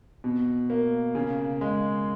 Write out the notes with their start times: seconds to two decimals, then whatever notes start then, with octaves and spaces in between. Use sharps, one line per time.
0.24 B2
0.70 A#3
1.15 C#3
1.61 G#3